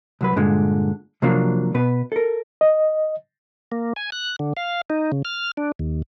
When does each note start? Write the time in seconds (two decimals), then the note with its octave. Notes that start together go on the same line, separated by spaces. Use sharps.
0.21 C2 F#3 B4
0.36 G2 A#2 D3 G#3
1.22 C3 F3 F#3 A#3 D4
1.74 B2 B3 B4
2.12 A4 A#4
2.61 D#5
3.72 A#3
3.96 G#5
4.12 F#6
4.39 D3
4.57 F5
4.90 D#4
5.12 C#3
5.25 F6
5.57 D4
5.79 D#2